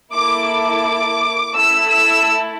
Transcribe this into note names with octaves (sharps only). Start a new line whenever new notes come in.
A#3 E4 A4 D6
D6
A3 E4 A4 E6
E6